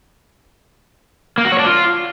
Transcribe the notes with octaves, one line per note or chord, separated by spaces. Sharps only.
A#3
F#4
C#5
D4
F4